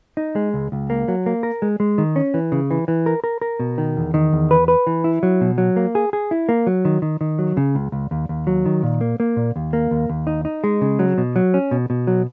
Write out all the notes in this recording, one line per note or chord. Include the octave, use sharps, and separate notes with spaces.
D#4
G#3
C#2
C#2
A#3
F#3
A#3
A#4
G#3
G#3
D#3
C#4
E3
C#3
E3
E3
A#4
A#4
A#4
B2
D#3
E2
D#3
E2
B4
B4
E3
E4
F#3
B2
F#3
A#3
G#4
G#4
E4
A#3
F#3
D#3
D#3
D#3
F#3
C#3
C#2
C#2
D#2
D#2
F#3
D#3
A#2
A#3
A#3
A#2
D#2
A#3
D#2
D#2
D#4
D#4
G#3
C#3
F#3
B2
F#3
C#4
B2
B2
F#3